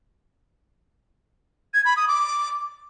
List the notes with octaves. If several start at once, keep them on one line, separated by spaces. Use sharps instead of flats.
G#6
B5
D#6
D6